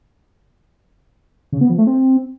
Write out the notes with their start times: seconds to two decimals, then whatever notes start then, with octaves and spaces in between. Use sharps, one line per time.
1.52 C#3
1.61 B3
1.70 F3
1.78 A3
1.87 C4